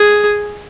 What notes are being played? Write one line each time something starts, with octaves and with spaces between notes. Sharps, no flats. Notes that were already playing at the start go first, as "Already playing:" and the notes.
Already playing: G#4